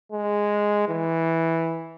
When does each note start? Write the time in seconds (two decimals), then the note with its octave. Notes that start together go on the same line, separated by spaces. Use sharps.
0.12 G#3
0.88 E3